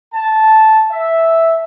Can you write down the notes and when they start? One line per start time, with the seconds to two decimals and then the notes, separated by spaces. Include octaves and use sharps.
0.14 A5
0.91 E5